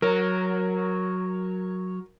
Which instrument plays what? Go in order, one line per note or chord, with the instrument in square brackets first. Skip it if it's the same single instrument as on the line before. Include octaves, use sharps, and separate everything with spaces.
[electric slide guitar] F#3 C#5 [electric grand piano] A#4